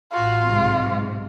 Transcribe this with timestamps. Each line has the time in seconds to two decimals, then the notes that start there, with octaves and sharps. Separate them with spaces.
0.13 A1 F4 F#4
0.46 B1 G#2 C3